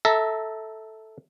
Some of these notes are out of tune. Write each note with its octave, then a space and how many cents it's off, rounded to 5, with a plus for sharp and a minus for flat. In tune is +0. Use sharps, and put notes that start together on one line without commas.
A4 +0 E5 -20 A#5 +0